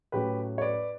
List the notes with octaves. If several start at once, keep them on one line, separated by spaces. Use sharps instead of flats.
A2 F#3 A3 C#4 G4 B4
C#5
B4 D5